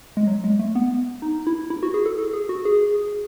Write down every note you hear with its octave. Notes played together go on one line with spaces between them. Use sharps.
G#3
F#3
G#3
A3
B3
D#4
E4
E4
F#4
G#4
A4
A4
G#4
F#4
G#4